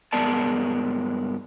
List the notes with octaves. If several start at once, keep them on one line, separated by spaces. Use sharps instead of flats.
G2 G#3 B3 A#4 D5 A5